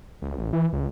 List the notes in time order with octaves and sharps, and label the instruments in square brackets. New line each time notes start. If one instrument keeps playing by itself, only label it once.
[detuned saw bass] C#2
A1
E3
C#2